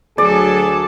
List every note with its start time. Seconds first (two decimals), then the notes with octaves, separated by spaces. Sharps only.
0.18 D2 F#3 G#4 A4 D5